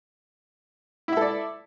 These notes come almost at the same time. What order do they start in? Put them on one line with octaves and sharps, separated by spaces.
E4 E5 A4 D5